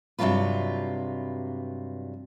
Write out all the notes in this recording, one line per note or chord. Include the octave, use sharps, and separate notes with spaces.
G2 C3 E3 F#3 F4 B4